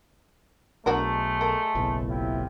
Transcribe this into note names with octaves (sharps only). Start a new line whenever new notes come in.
B1 G#3 A3 D4 F#4 A#4
A4 A#4
F#1 B1 A2
C3 E4 F4